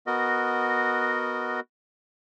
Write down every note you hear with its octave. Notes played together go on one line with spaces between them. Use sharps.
B3 F#4 A#4 D#5